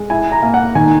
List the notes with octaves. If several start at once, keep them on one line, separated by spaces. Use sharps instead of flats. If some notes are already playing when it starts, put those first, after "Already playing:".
Already playing: G#3
E4 G#5
A#5
A#3
F#5
D#3 G#5